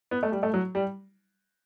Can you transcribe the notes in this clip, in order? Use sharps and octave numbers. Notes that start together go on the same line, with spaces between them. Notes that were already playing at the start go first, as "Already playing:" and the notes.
B3
A3
G3
A3
F#3
G3